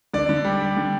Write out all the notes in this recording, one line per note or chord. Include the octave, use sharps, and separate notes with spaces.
D3 D5
D3
G3
G3
D3